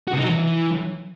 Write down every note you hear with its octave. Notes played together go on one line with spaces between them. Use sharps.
F#4
C3
D#4
F#3
E3